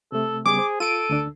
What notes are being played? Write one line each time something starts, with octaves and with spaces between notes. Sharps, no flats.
C3 A3 A4
C#3 G3 B3 G#4 D6
C5
F4 A4 D7 D#7
D2 D3 D4